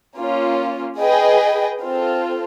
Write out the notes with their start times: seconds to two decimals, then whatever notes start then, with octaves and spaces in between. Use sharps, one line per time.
0.17 A#3 C#4 F4
0.99 G#4 B4 D#5 G5
1.81 C4 F4 A4